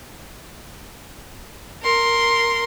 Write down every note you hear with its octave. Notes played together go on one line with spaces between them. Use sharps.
A#4 C6